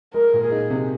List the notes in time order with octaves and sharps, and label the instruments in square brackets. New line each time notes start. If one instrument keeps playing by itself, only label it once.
[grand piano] G#3 [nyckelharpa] A#4
[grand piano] A#2
[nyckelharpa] G#4
[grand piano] D#4
C3